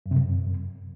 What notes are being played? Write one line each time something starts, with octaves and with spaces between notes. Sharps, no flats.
F#2
C3
F#2